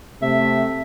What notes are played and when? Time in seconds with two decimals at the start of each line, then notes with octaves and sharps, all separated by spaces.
0.22 C3 A3 E5